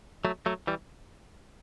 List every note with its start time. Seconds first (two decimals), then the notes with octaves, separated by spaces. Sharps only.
0.25 F#3 A3
0.46 F#3 A3
0.67 E3 G3